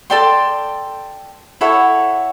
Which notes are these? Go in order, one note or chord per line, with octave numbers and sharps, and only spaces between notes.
A4 D5 G5 C6
E4 A4 C#5 F#5